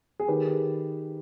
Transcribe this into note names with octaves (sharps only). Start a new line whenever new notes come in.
G#4
D#3 G4 B4